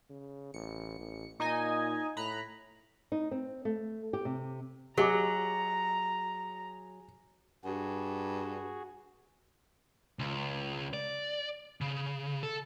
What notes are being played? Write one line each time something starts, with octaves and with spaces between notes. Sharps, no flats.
C#3
A1 C#7
A1
A#2 D#4 D#5 G#5
A2 A#5 B5 F#6
D#4
C4
A3
G4
C3
F#3 G4 G#4 D#5 A#5 D6
G2 F#4 G#4
C#2
D5
C#3
A4